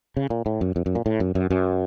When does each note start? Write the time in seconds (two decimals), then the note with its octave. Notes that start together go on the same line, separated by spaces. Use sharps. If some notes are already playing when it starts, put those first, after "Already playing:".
0.17 C#3
0.30 A#2
0.46 A2
0.61 F#2
0.76 F2
0.86 F#2
0.95 A#2
1.06 A2
1.20 F#2
1.35 F#2
1.50 F#2